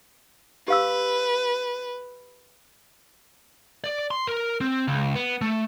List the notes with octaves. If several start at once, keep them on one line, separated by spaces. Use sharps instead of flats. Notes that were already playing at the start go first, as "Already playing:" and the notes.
G4 B4 F5 E6
D5
C6
A#4
C4
C#2
B3
A3